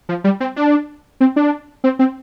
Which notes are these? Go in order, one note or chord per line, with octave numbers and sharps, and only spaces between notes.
F3
G3
C4
D4
C4
D4
C4
C4